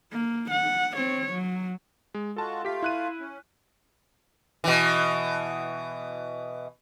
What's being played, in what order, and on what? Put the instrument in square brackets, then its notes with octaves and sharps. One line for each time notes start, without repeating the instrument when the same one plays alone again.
[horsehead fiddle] A#3
F#5
C4 C#5
F#3
[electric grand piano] G#3
[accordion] G#3 F4 F#4 [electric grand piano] A4 A5
[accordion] A3 F4 F5 [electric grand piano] G4 B6
[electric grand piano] E4 F#6 D#7
[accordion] C#4
[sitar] B2 E3